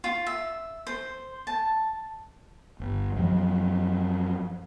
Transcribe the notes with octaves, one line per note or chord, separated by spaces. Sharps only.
F4
E5
C5
A5
G1
F#2 F3 F#3